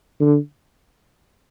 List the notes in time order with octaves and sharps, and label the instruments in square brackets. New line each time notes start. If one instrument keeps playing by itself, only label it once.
[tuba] D3